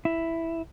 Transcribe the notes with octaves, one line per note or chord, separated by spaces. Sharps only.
E4